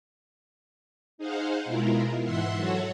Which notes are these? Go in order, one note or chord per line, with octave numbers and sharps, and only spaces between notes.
D#4 G#4 C5 F5 F#5
B2 G#3 E4 F4 A#4
G#2 E3 E5 F#5 C6
F#3 F#4 A4 C#5